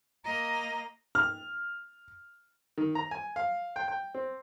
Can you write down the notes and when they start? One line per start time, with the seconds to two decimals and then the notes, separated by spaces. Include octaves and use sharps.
0.24 A#3 D#5 A#5
1.15 F6
2.78 D#3
2.95 A#5
3.11 G#5
3.36 F5
3.76 G5
3.88 G5
4.14 C4